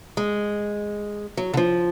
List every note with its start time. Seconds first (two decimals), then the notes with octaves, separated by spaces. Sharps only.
0.17 G#3
1.37 F#3
1.54 D3
1.57 F3